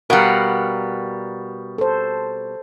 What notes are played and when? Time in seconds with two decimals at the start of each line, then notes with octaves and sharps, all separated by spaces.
0.10 B2 G3 A#4 F5 F#5
1.78 A4 C5